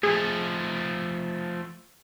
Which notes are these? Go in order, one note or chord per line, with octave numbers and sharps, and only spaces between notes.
F3 A3 G#4